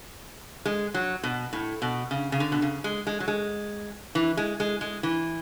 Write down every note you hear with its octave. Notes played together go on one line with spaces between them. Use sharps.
G#3
F#3
B2
A2
B2
C#3
C#3
D3
B2
C#3
G#3
G#3
F#3
G#3
E3
G#3
G#3
G#3
E3